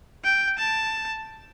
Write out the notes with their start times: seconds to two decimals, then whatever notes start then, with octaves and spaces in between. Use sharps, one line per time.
0.24 G5
0.58 A5